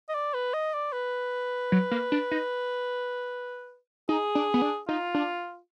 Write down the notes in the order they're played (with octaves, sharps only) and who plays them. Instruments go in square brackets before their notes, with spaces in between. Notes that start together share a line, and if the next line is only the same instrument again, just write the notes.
[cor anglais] D#5
D5
B4
D#5
D5
B4
[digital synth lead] F#3
A#3
D4
D#4
[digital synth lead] D#4 [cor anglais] G#4
[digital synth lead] D4
B3
D4
[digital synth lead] D#4 [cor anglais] F4
[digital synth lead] D4